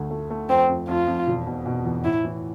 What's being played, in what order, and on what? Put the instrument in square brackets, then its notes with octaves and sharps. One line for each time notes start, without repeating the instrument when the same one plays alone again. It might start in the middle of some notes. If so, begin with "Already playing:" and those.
Already playing: [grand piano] D2 A3
A3
A3
[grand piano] F2 [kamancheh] C4
[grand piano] F2
[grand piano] F2 [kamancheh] F4
[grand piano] F2
E1
B2
B2
E2
[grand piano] A2 [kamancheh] E4
[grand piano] E3